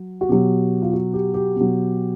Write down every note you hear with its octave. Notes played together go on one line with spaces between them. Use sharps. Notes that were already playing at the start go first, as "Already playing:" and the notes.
Already playing: F#3
F#4
B2 F#3 G4
F4
F#4
G4
G4
B2 F#3